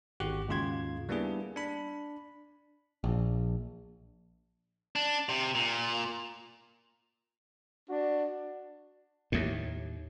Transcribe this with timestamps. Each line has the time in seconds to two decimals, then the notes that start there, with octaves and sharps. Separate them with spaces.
0.20 G#1 F#4 G4 F#5 F#6
0.48 D#2 G#2 C#3 F4 C6 G#6
1.09 G3 A#3 B3 D4 E4 G#4
1.56 D4 B5
3.04 A#1
4.96 D4
5.29 C3
5.55 A#2
7.90 D4 F#4
9.32 D#2 A2